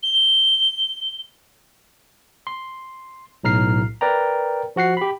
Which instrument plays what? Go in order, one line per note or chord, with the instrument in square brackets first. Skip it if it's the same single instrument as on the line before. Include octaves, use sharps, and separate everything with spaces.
[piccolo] G7
[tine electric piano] C6
B1 A2 A#5 F6 C7
A#4 B4 D5 G5 A#5
F3 F#4 F#5 C7
G4 B5